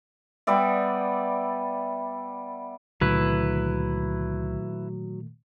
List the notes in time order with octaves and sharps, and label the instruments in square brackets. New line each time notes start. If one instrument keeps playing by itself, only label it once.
[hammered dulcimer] G3 B3 D5 E5
[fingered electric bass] C#2 D3 [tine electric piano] A#2 D#3 A3 [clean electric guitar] F#3 [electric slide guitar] E4 B4